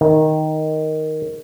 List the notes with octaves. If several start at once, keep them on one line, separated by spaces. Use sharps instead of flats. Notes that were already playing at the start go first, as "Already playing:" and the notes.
D#3